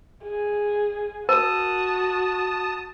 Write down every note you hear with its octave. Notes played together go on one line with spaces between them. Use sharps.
G#4
F#4 A#4 A5 D#6